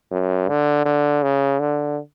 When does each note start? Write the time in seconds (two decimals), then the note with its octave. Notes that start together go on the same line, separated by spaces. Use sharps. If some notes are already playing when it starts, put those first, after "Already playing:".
0.11 F#2
0.48 D3
0.85 D3
1.23 C#3
1.60 D3